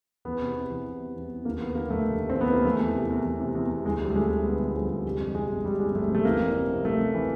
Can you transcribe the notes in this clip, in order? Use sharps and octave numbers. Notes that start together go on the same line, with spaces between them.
E2 B3
C3
C3
E3
E3
E2
E2
E2
D#2 A#3
D#2 B3
D3 A#3
F1 A3
F1
D#2
C4
D#2
B3
D#2 A#3
E2 A3
E3
C3
E2
E2
C3
E2
E2
D2 G#3
F3 G3
A3
D2 G#3
D2
D3 B3
F3
F3 G#3
D2
G#3
C3 G3
F2
C3 G#3
G1
G1 G3
G1 G#3
G1 A3
C3 A3
E3 A#3
F2
C3
C3
C3 A3
C3
E3